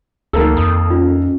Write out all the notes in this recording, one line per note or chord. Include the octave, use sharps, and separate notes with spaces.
D2 D#3 A#3 A4
F2 B5 D#6
C#4 D#4 F4